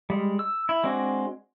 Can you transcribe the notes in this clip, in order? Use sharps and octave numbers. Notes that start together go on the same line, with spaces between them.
G3 G#3
E6
E4
G#3 C4 D4 F#4